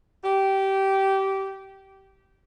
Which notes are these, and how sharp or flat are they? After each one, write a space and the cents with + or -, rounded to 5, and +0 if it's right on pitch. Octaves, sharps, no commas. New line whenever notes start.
G4 -20